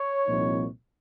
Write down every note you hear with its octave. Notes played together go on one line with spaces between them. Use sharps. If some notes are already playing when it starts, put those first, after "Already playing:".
Already playing: C#5
C2 A#2 F3 C4 D#4